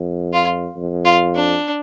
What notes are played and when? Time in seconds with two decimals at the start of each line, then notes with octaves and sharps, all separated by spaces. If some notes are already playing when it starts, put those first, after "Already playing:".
Already playing: F2
0.33 F4
0.76 F2
1.05 F4
1.35 D4